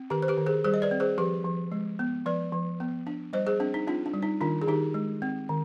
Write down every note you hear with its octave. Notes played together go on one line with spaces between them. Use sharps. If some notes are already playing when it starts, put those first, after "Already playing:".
Already playing: C4
D#3 G4 B4
C5
G4 B4
D#3
G#4 C5
G3 G#4 C5
D#5
B4 D5
C4
G#4 C5
F3 G4 B4
F3
G#3
B3
F3 B4 D5
F3
B3
D4
G3 C5 D#5
G#4 C5
C4 D4
D#4
C4 D4 F4
D4
G3
D#4
D#3 D4 F4
G#4
D#3 D#4 G4
G#3
C4
D#3